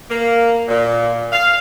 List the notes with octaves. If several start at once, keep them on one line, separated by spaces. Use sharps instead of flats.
A#3
A#2
F5